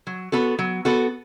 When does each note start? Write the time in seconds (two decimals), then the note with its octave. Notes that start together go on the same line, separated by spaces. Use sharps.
0.07 F#3
0.32 B3 F#4 A4
0.59 F#3
0.85 B3 F#4 A4